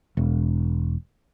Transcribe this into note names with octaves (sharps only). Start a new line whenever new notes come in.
E1